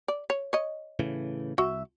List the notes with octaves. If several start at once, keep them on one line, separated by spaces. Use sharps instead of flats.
D5
C#5
C#5 D#5
A2 C#3 E3
C2 F#4 E5